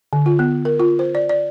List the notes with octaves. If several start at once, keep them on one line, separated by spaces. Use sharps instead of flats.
D3
F4
B3
A#4
F4
C5
D5
D5